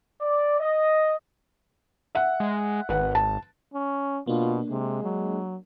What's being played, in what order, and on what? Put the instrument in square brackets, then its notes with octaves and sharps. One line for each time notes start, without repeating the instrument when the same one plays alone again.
[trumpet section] D5
D#5
[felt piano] E5 F#5
[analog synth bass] G#3
[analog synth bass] G#1 [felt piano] B4 F#5
[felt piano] A5
[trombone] C#4
[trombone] B2 [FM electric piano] A#3 D4 [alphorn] F4
[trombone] C3 [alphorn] G#3
[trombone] F#3